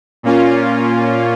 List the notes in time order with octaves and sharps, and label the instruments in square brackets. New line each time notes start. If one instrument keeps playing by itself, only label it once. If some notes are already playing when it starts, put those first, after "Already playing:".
[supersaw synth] A#2 A#3 C#4 F4